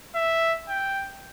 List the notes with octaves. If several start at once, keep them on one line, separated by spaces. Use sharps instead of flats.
E5
G5